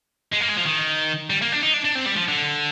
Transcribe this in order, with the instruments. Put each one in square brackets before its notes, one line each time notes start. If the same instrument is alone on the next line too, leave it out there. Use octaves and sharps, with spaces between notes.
[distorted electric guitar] G#3
A#3
G#3
F3
D#3
G3
A#3
D4
D#4
D4
D4
C4
G3
F3
D3